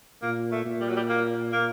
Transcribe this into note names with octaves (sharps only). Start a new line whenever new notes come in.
A#2 A#3
A3
A#2
G3
F#3
G3
A#3
A#3